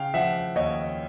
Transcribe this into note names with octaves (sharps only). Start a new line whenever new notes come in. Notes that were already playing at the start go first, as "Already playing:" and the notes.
Already playing: C#3 F5 G5
F3 E5 F#5
D#2 C#5 D#5